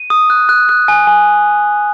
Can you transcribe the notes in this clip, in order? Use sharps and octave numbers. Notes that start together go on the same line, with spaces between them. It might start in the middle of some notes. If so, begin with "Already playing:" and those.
Already playing: D#7
D#6
F#6
F#6
F#6
G#5
G#5